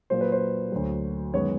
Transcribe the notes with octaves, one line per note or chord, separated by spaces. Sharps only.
A#2 F#3 A#3 C5
B4
C5
D2 D3 F#3
F#2 D#3 G#3 B3 C#5